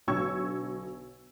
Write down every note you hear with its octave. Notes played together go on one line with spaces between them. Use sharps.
B1 D3 C#5 C#6 E6 G#6